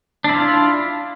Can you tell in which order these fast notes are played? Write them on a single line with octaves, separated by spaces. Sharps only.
D4 E4 F4